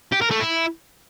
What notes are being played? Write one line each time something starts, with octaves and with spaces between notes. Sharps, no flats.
G4
A#4
A3
E4